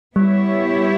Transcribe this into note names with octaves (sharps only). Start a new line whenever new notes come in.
G3 B3 E4 G4 C#5 E5